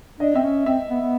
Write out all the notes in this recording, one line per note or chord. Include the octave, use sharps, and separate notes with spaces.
D4 D#5
C4 E5
C#4
C4 E5
B3
B3